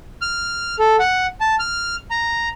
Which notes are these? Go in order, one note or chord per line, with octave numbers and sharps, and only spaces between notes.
F6
A4
F#5
A5
F6
A#5